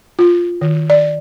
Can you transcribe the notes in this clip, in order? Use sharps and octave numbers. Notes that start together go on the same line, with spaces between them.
F4
D#3
D5